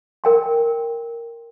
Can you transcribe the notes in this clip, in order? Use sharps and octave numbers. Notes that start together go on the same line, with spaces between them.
A#4 G5 C6